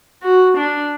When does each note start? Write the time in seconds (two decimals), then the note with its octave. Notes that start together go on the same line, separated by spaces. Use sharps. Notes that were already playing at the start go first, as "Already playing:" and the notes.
0.23 F#4
0.56 D4